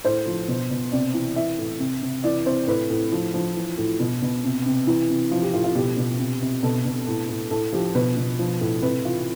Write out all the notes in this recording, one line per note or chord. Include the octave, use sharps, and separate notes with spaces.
A2 C5
F3
B2
B2
C3 D5
E3
E3 E5
A2
C3
C3
E3 D5
C3 C5
A2 B4
A2
F3
F3
E3
A2
B2
B2
C3
C3
E3
C3
F3 F4
G4
A2 F4
F4
B2 G4
B2
C3
C3
B2 A4
B2
A2
A2
A2 A4
F3 G4
B2 B4
B2
F3
A2
C3 B4
E3 F4